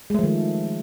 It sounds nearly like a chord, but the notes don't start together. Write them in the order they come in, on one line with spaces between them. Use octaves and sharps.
G#3 A3 F3 D#3